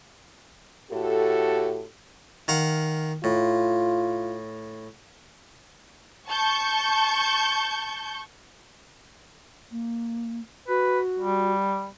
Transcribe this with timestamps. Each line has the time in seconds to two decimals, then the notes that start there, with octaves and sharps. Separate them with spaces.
0.91 A2 F#4 G4 A4
2.48 D#3 F5 F#5
3.24 A2 F4
6.29 A5 C#6 G6
9.71 A#3
10.68 F#4 B4
11.19 G3